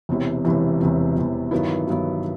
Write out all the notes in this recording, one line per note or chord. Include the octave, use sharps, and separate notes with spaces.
E1 E2 C3 E3
E1 E2 C3 E3
E1 E2 C3 E3
E1 E2 C3 E3
G2 D#3 F#3 B3 E4
G2 D#3 F#3 B3 E4